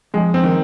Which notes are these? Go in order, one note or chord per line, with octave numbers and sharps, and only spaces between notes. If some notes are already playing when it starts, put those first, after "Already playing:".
F2 G#3
C4
D#3